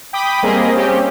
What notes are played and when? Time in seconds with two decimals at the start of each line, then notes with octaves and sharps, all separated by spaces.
0.13 G5 B5 D6 D#6 B6
0.43 G3 A#3 C4 G#4 D#5
0.74 C4 C#4 G4